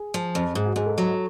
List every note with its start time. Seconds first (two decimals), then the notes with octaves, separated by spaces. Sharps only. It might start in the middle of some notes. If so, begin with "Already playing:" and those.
Already playing: G#4
0.14 F3
0.35 F2
0.55 G#2 G#4
0.65 F#4
0.76 G#2 G#4
0.86 A4
0.98 F#3